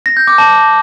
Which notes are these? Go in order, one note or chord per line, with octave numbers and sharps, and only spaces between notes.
A#6
G6
D6
A5